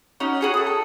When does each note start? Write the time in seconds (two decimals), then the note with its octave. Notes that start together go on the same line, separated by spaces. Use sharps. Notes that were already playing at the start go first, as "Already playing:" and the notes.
0.20 C#4 D#4 F#4
0.41 F#4 G#4 C#5
0.54 A3 D#6
0.67 A4